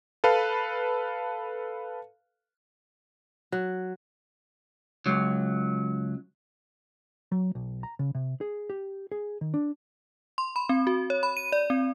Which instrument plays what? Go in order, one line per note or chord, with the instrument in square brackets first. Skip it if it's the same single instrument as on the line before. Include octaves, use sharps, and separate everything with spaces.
[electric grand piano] A4 B4 F5
[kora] F#3
[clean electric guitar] C#2 F#3
[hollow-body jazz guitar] F#3
B1
A#5
C#3
C3
G#4
G4
G#4
D#3
D4
[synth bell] C6
B5
C4
F#4
C#5
B5
D#7
D5
C4